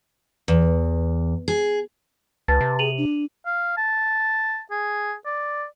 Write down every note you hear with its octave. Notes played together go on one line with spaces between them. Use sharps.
E2
G#4
C#2 B4 A5 A6
C3
G#4 D#7 F7 F#7
D4
F5
A5
G#4
D5